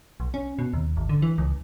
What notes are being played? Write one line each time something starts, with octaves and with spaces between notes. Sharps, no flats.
B1
C#4
B2
D#2
G#1
D3
E3
C#2